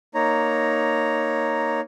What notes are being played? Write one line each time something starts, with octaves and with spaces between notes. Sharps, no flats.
A#3 D#4 C#5 A#5